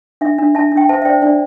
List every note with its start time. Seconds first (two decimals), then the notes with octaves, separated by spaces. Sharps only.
0.21 D4 E5
0.38 D4
0.55 D4 E5 A5
0.72 D4
0.77 G5
0.89 C5 E5 A5
1.02 E5
1.05 C5 D5 G5
1.22 D4 D5